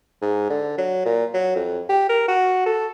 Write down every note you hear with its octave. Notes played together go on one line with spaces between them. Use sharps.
G#2
D3
F#3
A#2
F#3
F2
G4
A#4
F#4
A4